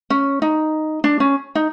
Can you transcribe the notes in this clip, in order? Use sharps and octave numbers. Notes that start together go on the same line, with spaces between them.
C#4
D#4
D4
C#4
D#4